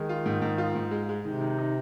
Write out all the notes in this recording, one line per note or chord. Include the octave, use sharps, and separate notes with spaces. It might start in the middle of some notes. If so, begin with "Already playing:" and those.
Already playing: D#3 G#3
F4
G#2
G#2
F4
G#2
G#3
G#3
C3 D#3
D#3
D#4